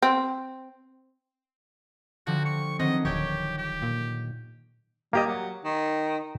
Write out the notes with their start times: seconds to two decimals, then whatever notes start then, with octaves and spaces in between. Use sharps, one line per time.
0.02 C4
2.27 D3 F3 G3 F#4
2.46 C#6
2.79 D#3 F#3 C4 D#5
3.05 D1 G4 C#5 G5 D7
3.58 G4
3.82 A#2
5.13 G3 A#3 G4 D#5
5.26 F#3
5.65 D#3